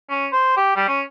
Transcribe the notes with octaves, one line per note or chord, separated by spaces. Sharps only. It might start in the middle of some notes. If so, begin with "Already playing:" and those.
C#4
C5
G4
G3
C#4